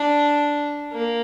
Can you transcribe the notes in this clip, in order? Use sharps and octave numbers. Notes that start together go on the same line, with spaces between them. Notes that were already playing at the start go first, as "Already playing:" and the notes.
Already playing: D4
A#3